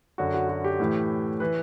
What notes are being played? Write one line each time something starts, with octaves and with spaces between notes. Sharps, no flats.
F#2 D3 F#4
F#4
F#4
G4
A2 E3
E3 B4